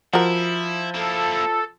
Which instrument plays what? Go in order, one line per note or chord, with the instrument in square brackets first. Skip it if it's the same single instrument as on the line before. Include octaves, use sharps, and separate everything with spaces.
[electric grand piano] F3 [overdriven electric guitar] E4 [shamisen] F#4 A#4
[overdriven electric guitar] A#3 E4 [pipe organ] A4